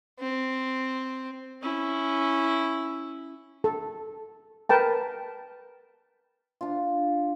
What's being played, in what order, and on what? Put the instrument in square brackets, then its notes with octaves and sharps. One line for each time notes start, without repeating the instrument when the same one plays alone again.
[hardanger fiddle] C4
[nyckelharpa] C#4 E4
[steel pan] A4
A#4 B4 G5 A5
[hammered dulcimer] D4 F4